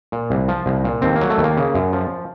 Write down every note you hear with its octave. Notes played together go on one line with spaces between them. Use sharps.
A#2
C2
F3
C2
A#2
D#2 C4
A#3
F#3
A3
D#2
A#3
C#3
F#2
F3